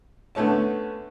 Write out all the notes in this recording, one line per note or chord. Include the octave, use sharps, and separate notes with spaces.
D3 A3 B3 C#4 A5